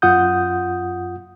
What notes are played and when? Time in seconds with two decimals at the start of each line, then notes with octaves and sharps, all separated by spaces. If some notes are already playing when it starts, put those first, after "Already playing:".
0.02 F#2 F4 F#5 D#6 G6